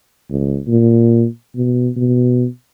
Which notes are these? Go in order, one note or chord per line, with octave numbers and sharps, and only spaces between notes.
C#2
A#2
B2
B2